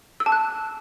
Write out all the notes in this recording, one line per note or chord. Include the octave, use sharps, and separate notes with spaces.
E6
A5
F#6